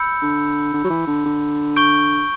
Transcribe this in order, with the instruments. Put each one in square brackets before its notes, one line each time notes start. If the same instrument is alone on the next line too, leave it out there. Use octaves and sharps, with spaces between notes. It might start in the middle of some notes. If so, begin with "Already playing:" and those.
Already playing: [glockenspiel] B5 E6 G6 C#7
[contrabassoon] D3
D3
F#3
E3
D3
D3
[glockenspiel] C#6 G6 D7 G7